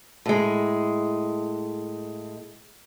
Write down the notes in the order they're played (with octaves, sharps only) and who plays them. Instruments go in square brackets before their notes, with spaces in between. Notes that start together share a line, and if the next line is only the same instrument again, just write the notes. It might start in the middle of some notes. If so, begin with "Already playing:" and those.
[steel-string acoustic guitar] A2 G#3